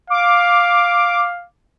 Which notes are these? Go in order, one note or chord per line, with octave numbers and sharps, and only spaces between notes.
F5 D6